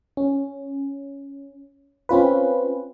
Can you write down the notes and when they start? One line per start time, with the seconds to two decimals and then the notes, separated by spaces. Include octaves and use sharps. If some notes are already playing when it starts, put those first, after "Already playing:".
0.17 C#4
2.09 C4 C#4 F4 B4